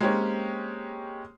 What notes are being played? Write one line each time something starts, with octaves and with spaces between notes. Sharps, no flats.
G#3 A#3 C4 C#4 G4 C#5